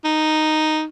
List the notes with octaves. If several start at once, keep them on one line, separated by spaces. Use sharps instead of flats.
D#4